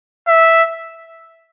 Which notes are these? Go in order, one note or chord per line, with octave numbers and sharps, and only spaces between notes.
E5